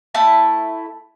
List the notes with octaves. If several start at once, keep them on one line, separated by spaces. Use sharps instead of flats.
A3 E4 A5